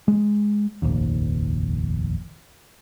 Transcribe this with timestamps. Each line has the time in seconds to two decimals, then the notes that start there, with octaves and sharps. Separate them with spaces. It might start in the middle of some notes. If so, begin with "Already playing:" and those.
0.08 G#3
0.82 F1 A#1 D#2